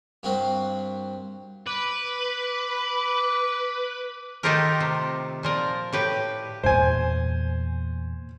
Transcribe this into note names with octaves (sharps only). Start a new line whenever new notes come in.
G2 A#3 C4 F#4
B4 D6
D#3 A3 D#4 F4 G4 A#4
C3
A#2 F3 A#4
A2 G4 B4
E2 A#2 C5 G#5